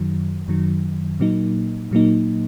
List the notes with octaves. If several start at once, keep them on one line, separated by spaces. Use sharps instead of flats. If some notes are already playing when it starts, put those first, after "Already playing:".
Already playing: F#2 D#3 F#3
F#2 D#3 F#3
A#2 F#3 A#3 D#4
A#2 F#3 A#3 D#4